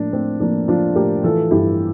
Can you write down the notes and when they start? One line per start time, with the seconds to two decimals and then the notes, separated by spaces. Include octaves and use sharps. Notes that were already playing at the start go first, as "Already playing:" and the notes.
Already playing: A2 F3 A#3 D4
0.13 A2 C4
0.40 F3 A#3 D4
0.68 F3 D4 F4
0.96 A2 G4 A#4
1.23 E3 F4 A4
1.51 G2 E4 G4